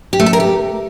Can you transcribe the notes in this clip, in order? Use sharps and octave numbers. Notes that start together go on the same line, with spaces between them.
G4
A3
A4
A#4
G4